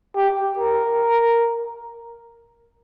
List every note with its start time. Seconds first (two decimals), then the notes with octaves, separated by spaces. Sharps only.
0.16 G4
0.59 A#4